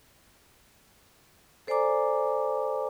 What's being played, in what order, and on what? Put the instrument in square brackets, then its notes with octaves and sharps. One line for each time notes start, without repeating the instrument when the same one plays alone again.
[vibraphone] A4 C5 D5 G#5 A#5 D6